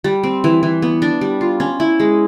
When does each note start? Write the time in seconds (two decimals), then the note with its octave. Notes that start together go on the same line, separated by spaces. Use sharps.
0.04 G3
0.23 C4
0.44 E3
0.63 E3
0.82 B3
1.02 D4
1.21 G3
1.41 F4
1.60 C#4
1.80 E4
2.00 G#3